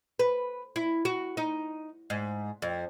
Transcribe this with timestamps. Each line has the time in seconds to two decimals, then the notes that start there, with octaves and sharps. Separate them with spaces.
0.19 B4
0.76 E4
1.05 F#4
1.37 D#4
2.10 G#2
2.62 F2